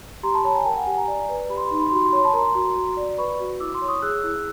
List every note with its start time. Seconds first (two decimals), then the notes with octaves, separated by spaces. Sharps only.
0.23 G4 A#5 C6
0.34 A5 B5
0.44 C#5 A5 B5
0.55 G#5 A#5
0.65 A#4 G5 A5
0.76 F#5 G#5
0.86 G4 F#5 G#5
0.97 G#5 A#5
1.08 D5
1.29 B4
1.50 G4 B5
1.57 C6
1.65 B5
1.71 D#4 C6
1.80 B5
1.87 C6
1.92 F#4 B5
2.01 C6
2.09 B5
2.13 C#5 C6
2.24 A5 B5
2.34 A#4 A#5 C6
2.55 F#4
2.76 F#4
2.97 D5
3.18 B4 B5 C#6
3.39 F#4
3.60 E4 D6 E6
3.74 C6 D6
3.82 C#5
3.88 C#6 D#6
4.02 G#4 E6 F#6
4.24 E4